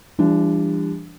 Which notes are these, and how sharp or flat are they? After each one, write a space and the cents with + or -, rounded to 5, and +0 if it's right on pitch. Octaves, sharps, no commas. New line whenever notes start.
E3 +45 G3 +30 D4 +0